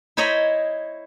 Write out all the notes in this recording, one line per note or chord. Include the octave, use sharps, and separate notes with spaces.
E4 C5 C#5 D#5 A#5 B5